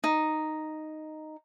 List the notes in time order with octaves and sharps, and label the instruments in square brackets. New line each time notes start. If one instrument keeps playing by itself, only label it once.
[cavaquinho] D#4